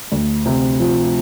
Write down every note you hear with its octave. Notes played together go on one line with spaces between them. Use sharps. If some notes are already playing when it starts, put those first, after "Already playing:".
D2
C3
F3